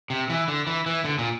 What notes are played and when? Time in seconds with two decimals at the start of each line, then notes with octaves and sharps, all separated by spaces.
0.10 C3
0.30 E3
0.48 D3
0.67 E3
0.86 E3
1.05 D3
1.18 A#2